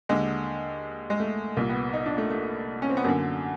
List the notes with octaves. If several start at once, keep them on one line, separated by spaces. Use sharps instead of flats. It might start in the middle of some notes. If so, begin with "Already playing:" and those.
D#2 D3 G#3
G#3
A3
C2 A#2 A#3
B3
D#4
D4
A3
A3
C#4
C4
B3
F#2 D3 A#3